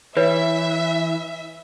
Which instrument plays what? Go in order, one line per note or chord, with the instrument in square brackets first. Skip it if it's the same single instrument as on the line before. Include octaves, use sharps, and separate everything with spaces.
[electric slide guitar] E3 [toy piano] B4 C#5 [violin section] E5